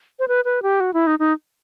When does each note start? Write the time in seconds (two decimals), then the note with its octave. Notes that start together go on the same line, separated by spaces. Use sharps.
0.19 C5
0.28 B4
0.45 B4
0.63 G4
0.80 F#4
0.94 E4
1.07 D#4
1.19 D#4